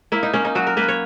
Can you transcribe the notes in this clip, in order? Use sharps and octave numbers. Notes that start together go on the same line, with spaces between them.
A#3 E4
D#4
A#3 C#4
D#4
F#3 F#4
A#4
A#3 B4
C#5